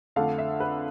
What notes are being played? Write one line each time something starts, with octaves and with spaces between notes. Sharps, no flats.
F2 D3 A3 D4 F5
E5
B4